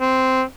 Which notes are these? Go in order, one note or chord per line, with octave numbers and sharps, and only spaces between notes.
C4